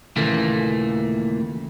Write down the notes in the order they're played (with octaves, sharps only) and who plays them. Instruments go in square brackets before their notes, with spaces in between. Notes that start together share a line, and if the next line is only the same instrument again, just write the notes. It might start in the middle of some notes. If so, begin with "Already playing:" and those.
[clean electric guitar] D#2 A#2 C#3 E3 A3 A#3